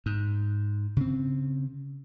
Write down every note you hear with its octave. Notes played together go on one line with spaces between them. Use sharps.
G#2
C#3 C4